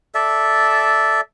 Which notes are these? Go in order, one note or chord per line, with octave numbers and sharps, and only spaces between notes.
A4 D5 E5